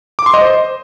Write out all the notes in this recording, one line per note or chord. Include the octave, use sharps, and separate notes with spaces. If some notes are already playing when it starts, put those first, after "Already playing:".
D6
C6
D#5
C5